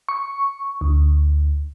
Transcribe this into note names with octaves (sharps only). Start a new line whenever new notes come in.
C#6
D2